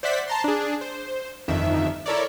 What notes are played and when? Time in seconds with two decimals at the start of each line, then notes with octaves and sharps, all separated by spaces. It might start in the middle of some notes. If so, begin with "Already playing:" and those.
0.03 C5 D5 E5 F#5 B6
0.28 A5 A#5 C6
0.44 D4 G#4
0.81 C5
1.48 G1 F2 D#3 E5
2.06 E4 A4 A#4 C#5 D5